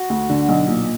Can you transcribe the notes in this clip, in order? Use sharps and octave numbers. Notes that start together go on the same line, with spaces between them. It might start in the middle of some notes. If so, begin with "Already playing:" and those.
Already playing: F#4
D2
D3
B1
A#2